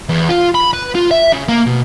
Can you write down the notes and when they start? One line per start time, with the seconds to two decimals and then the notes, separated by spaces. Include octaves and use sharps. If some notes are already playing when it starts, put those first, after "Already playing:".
0.09 E2
0.29 F4
0.54 B5
0.73 B4
0.95 F4
1.11 E5
1.33 C#3
1.49 A#3
1.67 B2